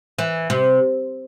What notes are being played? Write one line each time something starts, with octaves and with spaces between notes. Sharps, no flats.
E3
C3